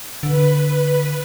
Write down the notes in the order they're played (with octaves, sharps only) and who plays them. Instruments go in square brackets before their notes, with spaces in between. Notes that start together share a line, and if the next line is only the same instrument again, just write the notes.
[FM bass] D3 [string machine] B4